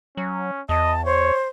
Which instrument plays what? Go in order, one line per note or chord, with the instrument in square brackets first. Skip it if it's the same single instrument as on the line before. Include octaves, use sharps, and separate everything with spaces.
[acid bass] F#3 [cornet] C#4
[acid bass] E2 [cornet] D#5 [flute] A5
[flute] C5 [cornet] C#5